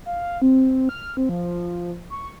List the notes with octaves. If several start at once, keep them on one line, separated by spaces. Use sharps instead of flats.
F5
C4
F6
C4
F3
C#6